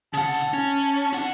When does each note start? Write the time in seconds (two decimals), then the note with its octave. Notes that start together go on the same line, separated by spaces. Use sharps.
0.14 C#3 F#5 A5
0.54 C#4
1.13 D4 F#5